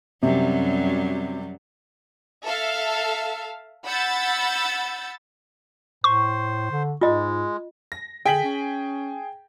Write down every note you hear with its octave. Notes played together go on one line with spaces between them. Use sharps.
F#2 C3 F#3 G3
A4 E5 F5
F#5 B5 E6 G6 A6
A2 C5 C#6
D3
G#2 G#3 F4 D#5
A#6
D3 G#4 G5 B6 F#7
C#4